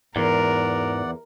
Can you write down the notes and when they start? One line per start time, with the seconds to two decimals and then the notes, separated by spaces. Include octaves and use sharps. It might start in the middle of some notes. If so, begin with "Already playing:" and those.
0.16 E2 G#2 E3 A#4 D5 F#5